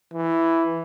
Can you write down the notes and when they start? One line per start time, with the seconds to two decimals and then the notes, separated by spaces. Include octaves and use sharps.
0.14 E3